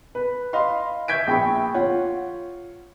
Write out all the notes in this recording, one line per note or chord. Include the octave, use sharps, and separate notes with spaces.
B4
D#5 F5 B5 C6
E5 C#6 G6 G#6 B6 D7
A#1 G5 B5 C#6
F4 C#5 F#5